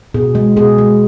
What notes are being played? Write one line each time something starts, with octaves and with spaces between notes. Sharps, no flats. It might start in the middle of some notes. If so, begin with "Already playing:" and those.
B2 G#4
G#3
B2 G#4
G#3